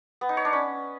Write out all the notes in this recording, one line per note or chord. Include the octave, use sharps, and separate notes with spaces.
B3
D#4
C#5
D4
C#4